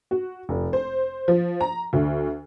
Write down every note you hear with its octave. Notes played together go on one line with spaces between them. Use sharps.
F#4
F1
C5
F3
A#5
D2